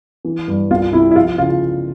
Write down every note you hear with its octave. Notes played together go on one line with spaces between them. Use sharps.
E3
G2
C2 F4
C3 E4
E4
F3 F4
C#3 F4